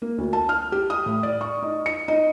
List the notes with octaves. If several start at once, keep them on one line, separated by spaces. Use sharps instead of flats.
A#3
D2
A5
F6
G4
D#6
A2
D5
C#6
D#4
C#7
D#4